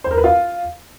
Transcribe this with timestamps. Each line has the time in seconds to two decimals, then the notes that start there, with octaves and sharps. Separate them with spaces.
0.04 C5
0.11 A#4
0.17 B4
0.24 F4